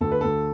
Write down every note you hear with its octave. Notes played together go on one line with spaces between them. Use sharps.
D2 A4
B4
D2 A4